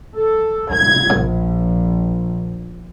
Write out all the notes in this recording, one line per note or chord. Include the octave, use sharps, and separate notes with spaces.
A4
G#6
A#1